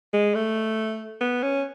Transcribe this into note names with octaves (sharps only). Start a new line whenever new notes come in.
G#3
A3
B3
C#4